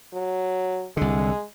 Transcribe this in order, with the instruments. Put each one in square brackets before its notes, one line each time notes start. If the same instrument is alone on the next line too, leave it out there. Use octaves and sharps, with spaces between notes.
[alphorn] F#3
[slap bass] C2 D3 [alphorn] G#3